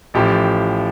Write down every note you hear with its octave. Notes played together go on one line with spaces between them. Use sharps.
A1 A2 F3 G4